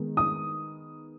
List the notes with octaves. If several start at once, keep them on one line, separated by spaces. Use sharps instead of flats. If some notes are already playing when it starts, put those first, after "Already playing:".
Already playing: D#3 G#3 B3 D#4
D#6